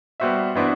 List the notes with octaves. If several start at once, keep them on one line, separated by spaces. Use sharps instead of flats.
G3 B3 F#4 C5 E5
E3 B3 D4 F#4 C5